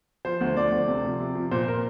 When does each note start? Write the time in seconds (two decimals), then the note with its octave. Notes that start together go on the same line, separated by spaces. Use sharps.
0.25 F3 C5
0.41 D2
0.56 F3 D5
0.72 D2
0.88 C3
1.04 F3
1.20 C3
1.35 F3
1.51 A#2 C5
1.67 A#2 A#4